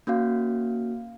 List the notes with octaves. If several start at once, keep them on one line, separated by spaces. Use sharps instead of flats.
A#3 C#4 F#4 F5